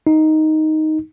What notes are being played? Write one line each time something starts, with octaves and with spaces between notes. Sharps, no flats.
D#4